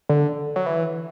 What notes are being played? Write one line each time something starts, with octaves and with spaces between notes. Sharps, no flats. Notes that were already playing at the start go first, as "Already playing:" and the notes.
D3
F#3
E3